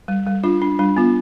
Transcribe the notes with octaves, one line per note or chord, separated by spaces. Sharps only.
G3
G3
D4 F4
D4
G3 D4
B3 F4